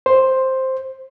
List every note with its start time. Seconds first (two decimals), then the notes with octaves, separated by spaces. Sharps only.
0.06 C5